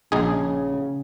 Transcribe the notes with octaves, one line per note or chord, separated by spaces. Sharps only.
A#1 C#3 D#4 G#4